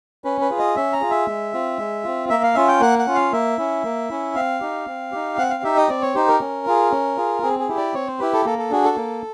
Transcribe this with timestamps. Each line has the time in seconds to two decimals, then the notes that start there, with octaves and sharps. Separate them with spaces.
0.24 C#4 B4
0.41 B4
0.51 F4 G#4
0.58 D#5
0.76 C#4 E5
0.93 A#5
1.01 F4 G#4
1.10 E5
1.27 G#3
1.53 C4 F4
1.79 G#3
2.04 C4 F4
2.29 A#3 E5
2.43 F5
2.55 C#4 F4 E5
2.68 G5
2.80 A#3 F#5
2.99 F#5
3.06 C#4 F4
3.15 F5
3.32 A#3 E5
3.58 C#4 E4
3.84 A#3
4.10 C#4 E4
4.35 C4 F5
4.60 D#4 G4
4.87 C4
5.12 D#4 G4
5.37 C4 F#5
5.50 F5
5.63 D#4 G4 E5
5.77 D#5
5.88 C4 D5
6.02 C#5
6.15 D#4 G4 C5
6.28 A#4
6.40 C#4
6.67 F4 G#4
6.91 C#4
7.17 F4 G#4
7.43 C4 G#4
7.59 G#4
7.69 E4 G4
7.77 D5
7.94 C4 C#5
8.07 C5
8.19 E4 G4 B4
8.33 A4
8.45 A#3 A4
8.58 A4
8.71 D4 F#4 G#4
8.84 A4
8.96 A#3